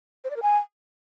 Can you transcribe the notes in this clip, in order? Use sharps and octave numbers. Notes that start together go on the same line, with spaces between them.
C5
D5
A#4
G#5